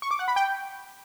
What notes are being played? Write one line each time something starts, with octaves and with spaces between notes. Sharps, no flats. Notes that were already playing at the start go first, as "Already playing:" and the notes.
C#6
D6
F#5
B5
G5